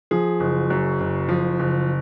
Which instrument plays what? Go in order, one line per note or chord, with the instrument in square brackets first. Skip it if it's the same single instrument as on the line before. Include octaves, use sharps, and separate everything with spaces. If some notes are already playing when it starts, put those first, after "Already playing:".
[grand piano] F3 G#4
F#1
F#2
F#1
F3
F#1